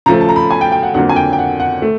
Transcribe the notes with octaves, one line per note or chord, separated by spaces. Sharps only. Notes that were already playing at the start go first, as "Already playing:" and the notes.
C#3 F3 A3 A#5
A5
A#5
B5
G#5
G5
G5
F#5
F2 D3 F#3 A#3 F#5
G#5
G5
G5
F#5
F#5
A3